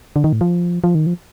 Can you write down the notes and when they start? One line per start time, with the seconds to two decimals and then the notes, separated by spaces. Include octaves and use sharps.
0.16 D3
0.24 D#3
0.33 A2
0.41 F3
0.84 F3
0.95 D#3
1.06 F3